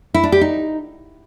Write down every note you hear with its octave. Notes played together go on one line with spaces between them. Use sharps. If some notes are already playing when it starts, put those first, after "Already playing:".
E4
D4
G4
D#4